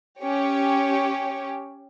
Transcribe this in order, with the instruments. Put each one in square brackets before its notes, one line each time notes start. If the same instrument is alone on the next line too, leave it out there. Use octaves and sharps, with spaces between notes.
[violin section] C#4 G4 C#5